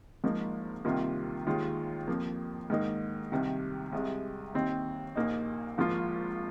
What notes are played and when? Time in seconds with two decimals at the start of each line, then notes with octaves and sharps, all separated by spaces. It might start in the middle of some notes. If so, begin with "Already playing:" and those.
0.24 G#1 G#2 F3 A#3 D#4
0.85 C2 C3 D#3 A#3 F4
1.47 D#2 D#3 G#3 F4
2.07 F2 F3 A#3
2.70 G#2 D#3 A#3 D#4
3.32 C2 C3 D#3
3.93 C2 C3 G#3
4.54 D#2 D#3 C4 D#4
5.16 A#1 A#2 A#3 D#4
5.78 G#1 G#2 F3 A#3 F4